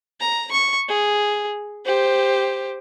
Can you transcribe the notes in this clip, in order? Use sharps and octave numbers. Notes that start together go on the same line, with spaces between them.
A#5
C#6
G#4
G4 C5